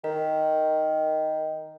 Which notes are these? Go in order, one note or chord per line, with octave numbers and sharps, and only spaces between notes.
D#3 A#4